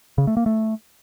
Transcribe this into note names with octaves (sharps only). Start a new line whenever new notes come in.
C#3
A3
A#3
A3